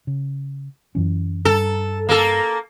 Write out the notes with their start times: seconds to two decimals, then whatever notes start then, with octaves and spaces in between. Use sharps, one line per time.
0.07 C#3
0.95 F#2 E3 C#4
1.45 G2 A4
2.09 A#3 A4